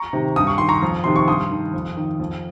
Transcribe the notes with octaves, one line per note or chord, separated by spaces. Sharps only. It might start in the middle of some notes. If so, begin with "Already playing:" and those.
Already playing: A#5 C#6
C3 D#3
G2 D#6
C#6
D#3 C6
A#5 C#6
F2
C3 D#3 C6
C#6
G2 C6 D#6
D#3
F2
D#3
F2